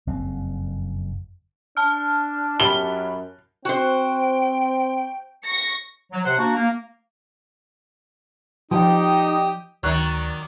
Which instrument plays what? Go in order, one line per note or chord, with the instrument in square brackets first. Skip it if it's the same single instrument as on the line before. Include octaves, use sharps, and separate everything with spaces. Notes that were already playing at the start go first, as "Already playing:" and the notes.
[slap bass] F#1 F2 C4
[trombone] D4 [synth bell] A5 F6
[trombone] F#2 [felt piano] G4 C#5 B5 [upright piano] G7
[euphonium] C4 [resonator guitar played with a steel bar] F#4 C5 [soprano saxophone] G5
[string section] C#6 A#6 C#7
[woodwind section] F#3
C3 C5 F#5
A#3 D4 F#4
A#3
[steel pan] F3 [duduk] D#4 [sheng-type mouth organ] G4 G5 D#6 [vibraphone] D5 D#5 D6
[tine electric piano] D2 C#6 F#6 [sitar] D#3 F#3 [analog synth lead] D5